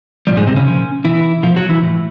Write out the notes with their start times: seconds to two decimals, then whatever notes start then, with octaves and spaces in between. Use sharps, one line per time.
0.27 A#2 F3 G3
0.37 G#2 G#3
0.47 C3 C4
0.56 C#3 C#4
0.66 A#2 F3
1.04 B2 E3 E4
1.43 B2 F3 F4
1.56 F#3 F#4
1.69 E3 E4
1.82 A2 E3